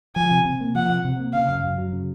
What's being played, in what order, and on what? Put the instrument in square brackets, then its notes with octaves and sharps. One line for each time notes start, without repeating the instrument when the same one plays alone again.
[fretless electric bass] F3 [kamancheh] G#5
[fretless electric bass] C3
C3
A#3
[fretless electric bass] F3 [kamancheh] F#5
[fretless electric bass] C3
C3
A#3
[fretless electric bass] C#3 [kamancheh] F5
[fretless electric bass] F#2
F#2
F#3
C#3